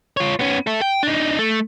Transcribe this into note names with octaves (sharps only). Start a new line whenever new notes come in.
F4 C#5
B3 C#4
A4 E5
G5
D4 D#4
A3